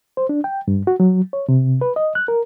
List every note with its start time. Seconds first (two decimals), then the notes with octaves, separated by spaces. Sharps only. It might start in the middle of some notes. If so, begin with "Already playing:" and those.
0.17 C5
0.29 D4
0.44 G5
0.68 G2
0.87 F#4
1.00 F#3
1.33 C#5
1.49 C3
1.81 B4
1.96 D#5
2.15 F#6
2.28 A#4